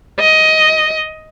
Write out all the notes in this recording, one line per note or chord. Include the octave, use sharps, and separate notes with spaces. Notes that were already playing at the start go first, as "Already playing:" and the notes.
D#5